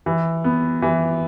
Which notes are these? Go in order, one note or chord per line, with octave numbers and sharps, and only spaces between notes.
E3
B3
E3